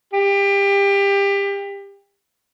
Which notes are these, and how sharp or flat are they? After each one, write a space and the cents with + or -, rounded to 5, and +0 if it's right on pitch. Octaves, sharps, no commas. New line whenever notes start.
G4 +25